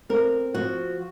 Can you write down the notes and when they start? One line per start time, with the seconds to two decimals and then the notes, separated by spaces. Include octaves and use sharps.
0.09 C4 A#4
0.54 F3 F#4